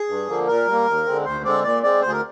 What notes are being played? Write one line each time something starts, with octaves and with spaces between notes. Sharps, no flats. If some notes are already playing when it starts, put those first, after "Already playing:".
Already playing: G#4
G2
D3 F3 A#3
A#2 A#4
G3 A#3
D#2
D3 G#3 C4
D2 C5
D3 G#3 C4 D5
A#2 D5
G#3 C4 D5
D2 C5
G#4
A#4